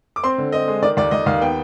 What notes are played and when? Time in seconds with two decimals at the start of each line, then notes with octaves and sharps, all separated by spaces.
0.16 D6
0.23 C4 C6
0.38 D3
0.52 C4 D#5
0.68 G#3
0.82 D#3 D5
0.97 D#2 D5
1.11 D#2 D#5
1.26 D#2 F5
1.41 B3 G5